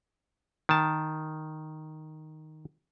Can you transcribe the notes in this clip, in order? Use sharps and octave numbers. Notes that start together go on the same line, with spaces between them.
D#3 A5